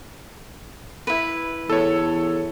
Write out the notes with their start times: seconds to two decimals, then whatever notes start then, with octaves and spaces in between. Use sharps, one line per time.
1.07 E4 B4
1.70 E2 A4 C#5